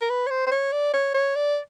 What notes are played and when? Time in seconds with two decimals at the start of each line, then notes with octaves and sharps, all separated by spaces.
0.01 A#4
0.10 B4
0.27 C#5
0.30 C5
0.47 C5
0.51 C#5
0.72 D5
0.93 C#5
1.14 C#5
1.35 D5